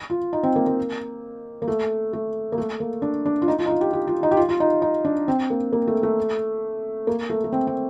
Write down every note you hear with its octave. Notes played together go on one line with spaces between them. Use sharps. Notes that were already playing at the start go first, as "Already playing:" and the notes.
F4
D#4
C4
A#3
A#3
A#3
A3
A3
A#3
A3
A#3
D4
D4
F4
D#4
F4
D#4
F4
G4
G4
F4
D#4
G4
F4
F4
D#4
D#4
D4
C4
A#3
A#3
A3
A3
A#3
A3
A3
C4
C4